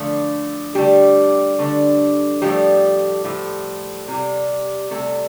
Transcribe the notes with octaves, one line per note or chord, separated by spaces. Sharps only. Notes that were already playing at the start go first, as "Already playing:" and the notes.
Already playing: D3 F3 A3
D3 G3 A3 G4
D3 A3
A2 F3 G3 A3 G4
A2 F3 A3
C3 G3
C3 G3 A3 A4